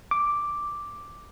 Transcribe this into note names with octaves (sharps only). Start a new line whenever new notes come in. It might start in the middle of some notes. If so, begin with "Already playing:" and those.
D6